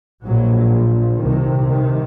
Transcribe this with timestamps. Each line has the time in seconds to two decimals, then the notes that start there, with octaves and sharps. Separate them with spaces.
0.24 A#1 A#2 F#3
0.72 F3
1.20 C2 C3 D#3
1.68 D#3